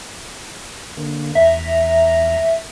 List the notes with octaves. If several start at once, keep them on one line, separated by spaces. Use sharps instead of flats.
D3 A#3
E2 E5 A#5